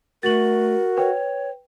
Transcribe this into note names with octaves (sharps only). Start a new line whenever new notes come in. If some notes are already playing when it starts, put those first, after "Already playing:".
A3 F#4 A#4 A6 F#7
B4 C#5 G5